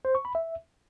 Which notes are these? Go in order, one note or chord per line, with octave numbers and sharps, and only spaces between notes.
C5
C#6
B5
E5